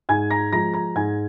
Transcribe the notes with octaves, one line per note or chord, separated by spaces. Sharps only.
G#2 G#5 G#6
A#5 A#6
F3 G#3 A#5 A#6
A#5 A#6
G#2 G#5 G#6